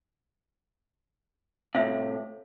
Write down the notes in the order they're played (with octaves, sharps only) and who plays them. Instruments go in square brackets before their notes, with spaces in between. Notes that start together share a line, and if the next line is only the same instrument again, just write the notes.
[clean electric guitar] A2 C3 [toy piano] E5 F5